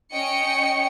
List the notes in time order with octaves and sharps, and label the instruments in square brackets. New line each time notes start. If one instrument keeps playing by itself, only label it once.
[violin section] C#4 D#5 G5 C#7